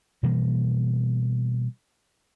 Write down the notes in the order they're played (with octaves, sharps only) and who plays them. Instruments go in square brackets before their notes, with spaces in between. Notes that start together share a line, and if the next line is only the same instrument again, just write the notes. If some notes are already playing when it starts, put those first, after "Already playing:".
[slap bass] B2 E3 G3 A#3